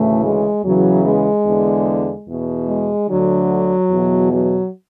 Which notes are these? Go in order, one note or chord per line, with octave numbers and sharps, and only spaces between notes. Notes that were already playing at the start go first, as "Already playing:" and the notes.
Already playing: D2 A2 C#3 E3 A3
G#3
E2 C#3 E3 F#3
G#3
E2 D3
E2 B2
G#3
D2 D3 F#3
E2 B2
F#3